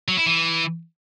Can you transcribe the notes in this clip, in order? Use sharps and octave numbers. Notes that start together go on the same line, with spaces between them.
F#3
E4
E3